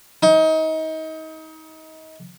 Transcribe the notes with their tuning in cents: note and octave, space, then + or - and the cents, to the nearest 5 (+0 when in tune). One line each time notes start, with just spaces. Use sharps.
D#4 +30